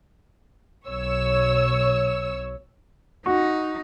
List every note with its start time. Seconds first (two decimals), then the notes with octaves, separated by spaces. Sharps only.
0.87 B1 C#5 E6
3.26 D#4 F#4